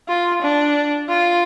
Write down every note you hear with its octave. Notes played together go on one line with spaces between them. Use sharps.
F4
D4
F4